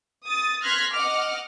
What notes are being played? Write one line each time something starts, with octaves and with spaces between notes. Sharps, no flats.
D#6 A6
C6 F6 F#6 G#6 A#6 B6
D#5 F#5 D6 F6